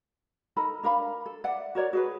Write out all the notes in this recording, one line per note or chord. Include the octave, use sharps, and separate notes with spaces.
D#4 A4 A#4 B5
D4 A#4 F5 B5
A4
D5 E5 F#5
F#4 A#4 C#5 D5
F#4 G#4 B4